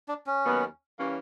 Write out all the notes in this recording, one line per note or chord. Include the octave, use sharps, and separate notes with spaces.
D4
C#4
D#2 D#3 F#3 B3
E3 G3 A#3 C#4